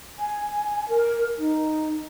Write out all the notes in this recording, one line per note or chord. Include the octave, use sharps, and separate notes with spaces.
G#5
A#4
D#4